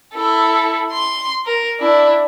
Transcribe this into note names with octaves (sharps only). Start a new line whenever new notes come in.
E4 A4
C6
A#4
D4 E4